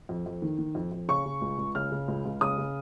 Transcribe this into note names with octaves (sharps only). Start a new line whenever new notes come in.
F2
F2
D#3
D#3
F2
F2
C#3 C#6
C#3
C#2
C#2
C#3 F6
C#3
C#2
C#2
C#3 D#6
C#3